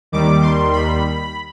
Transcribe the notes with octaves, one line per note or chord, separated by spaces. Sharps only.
D#2 D#3 G3 D6
C6
B5